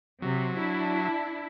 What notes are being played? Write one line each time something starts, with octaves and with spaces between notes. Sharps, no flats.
C3 F#3
D4 E4